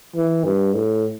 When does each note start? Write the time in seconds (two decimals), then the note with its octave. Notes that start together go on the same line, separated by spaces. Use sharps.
0.15 E3
0.45 G2
0.74 A2